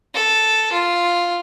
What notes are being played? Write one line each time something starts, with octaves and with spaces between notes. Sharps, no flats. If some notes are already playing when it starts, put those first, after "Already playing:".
A4
F4